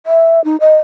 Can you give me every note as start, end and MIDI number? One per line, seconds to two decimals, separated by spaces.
0.06 0.43 76
0.44 0.57 63
0.61 0.77 75